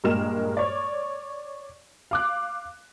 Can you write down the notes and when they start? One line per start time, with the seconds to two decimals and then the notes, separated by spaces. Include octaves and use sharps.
0.04 G2 A#2 G#3 A#4 F6 E7
0.57 C#5 D5
2.11 F5 D6 F#6